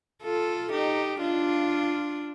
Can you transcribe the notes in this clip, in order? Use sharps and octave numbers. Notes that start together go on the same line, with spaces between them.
F4 A4
D#4 G4
D4 F4